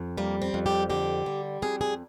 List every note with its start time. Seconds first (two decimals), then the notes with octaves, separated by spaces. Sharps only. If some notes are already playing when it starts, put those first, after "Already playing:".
Already playing: F2
0.18 G3 A#3
0.42 C4
0.54 F2
0.66 G4
0.90 D3 G4
1.26 G3
1.62 F2 G#4
1.81 G#4